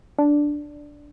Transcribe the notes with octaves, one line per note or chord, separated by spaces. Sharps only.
D4